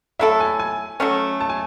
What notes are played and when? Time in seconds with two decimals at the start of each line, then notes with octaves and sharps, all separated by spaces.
0.19 F#3 A3 E4 A4 E5
0.40 G#5
0.59 G#5
1.00 F#3 A3 C#4
1.40 A5
1.49 G#5